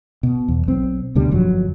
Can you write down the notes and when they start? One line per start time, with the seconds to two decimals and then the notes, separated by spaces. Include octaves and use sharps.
0.23 B2
0.48 E2
0.68 B1 C4
1.15 D2 B2 D3 G3
1.31 G1 F2 F3 F#3